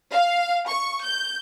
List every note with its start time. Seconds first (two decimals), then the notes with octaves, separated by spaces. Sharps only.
0.13 F5
0.69 C#6
1.04 G6